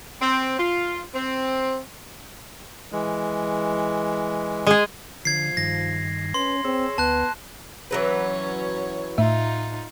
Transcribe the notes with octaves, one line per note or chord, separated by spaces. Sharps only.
C4
F4
C4
E3 G#3
G#3 G#4
D3 F3 G#6 C7
G2 D#3 A#6
C#4 B4 C6
C4 G#4 C#5 E6
D2 B3 A5 F#6
E3 F#3 C#4 B4 C#5
A2 D#4 F4 E5